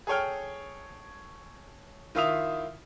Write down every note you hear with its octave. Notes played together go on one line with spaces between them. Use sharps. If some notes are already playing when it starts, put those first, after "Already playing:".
G#4 A4 C#5 G5 F6
D#3 E4 F4 E5 D#6 F7